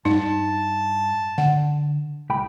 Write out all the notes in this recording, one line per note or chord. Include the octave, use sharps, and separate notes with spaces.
G2 D#4 A5
D3 F#5
C2 G5 B5